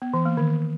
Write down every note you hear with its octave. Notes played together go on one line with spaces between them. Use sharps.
B3
E3
A#3
D#3